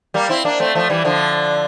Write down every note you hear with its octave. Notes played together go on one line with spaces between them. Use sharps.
G3 A#3
C4 E4
A#3 D4
A3 C4
F3 A3
E3 G3
D3 F3